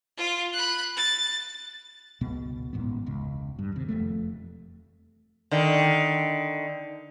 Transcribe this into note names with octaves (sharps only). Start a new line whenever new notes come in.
F4
B5 F#6
A6
G1 C#2 B2 B3
D1 A1 G#2 B3
E1 C#2
G2
D#2 C3
E1 C2 F2 A3
D3 D#3